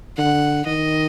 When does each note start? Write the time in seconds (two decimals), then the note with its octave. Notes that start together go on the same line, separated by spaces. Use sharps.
0.17 D3 F#5
0.66 D#3 D#5